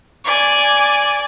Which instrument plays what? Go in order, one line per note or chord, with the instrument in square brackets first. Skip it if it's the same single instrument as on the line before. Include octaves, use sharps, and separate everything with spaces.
[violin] D5 G#5